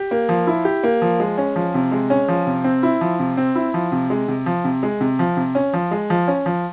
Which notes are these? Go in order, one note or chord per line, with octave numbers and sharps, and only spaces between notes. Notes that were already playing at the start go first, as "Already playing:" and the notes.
Already playing: G4
A#3
F3
E4
G4
A#3
F3
G#3
C#4
F3
C3
G#3
C#4
F3
C3
C4
E4
F3
C3
C4
E4
F3
C3
G#3
C3
F3
C3
G#3
C3
F3
C3
C#4
F3
G#3
F3
C#4
F3